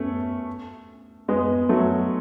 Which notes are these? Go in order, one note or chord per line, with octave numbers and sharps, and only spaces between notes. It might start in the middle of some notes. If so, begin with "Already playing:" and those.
Already playing: A3 B3 C#4
G#3 B3
F#3 A3